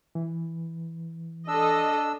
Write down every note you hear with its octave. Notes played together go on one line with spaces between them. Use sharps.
E3
D4 A4 D#5 E6